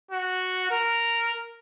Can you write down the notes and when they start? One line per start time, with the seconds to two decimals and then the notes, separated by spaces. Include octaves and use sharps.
0.11 F#4
0.71 A#4